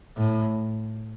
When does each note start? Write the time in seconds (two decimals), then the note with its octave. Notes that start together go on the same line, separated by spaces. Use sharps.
0.17 A2